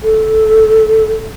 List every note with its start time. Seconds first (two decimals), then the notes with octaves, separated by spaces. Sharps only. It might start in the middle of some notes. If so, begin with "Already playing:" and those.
0.03 A4